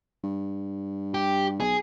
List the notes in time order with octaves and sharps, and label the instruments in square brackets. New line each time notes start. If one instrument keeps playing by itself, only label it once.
[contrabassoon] G2
[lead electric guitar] G4
[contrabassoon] B1 [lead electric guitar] G#4